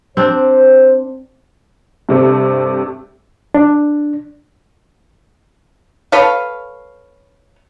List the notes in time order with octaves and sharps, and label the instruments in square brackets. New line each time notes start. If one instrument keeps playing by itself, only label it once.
[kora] C4 D4 [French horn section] C5
[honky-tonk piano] G2 C3 A3
[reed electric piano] D4
[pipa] A4 B4 C#5 F5